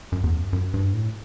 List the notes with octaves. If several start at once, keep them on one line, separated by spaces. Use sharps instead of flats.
F#2
E2
F#2
F#2
G2
A2